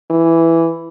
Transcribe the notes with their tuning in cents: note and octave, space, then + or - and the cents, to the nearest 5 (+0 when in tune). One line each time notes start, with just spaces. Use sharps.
E3 +5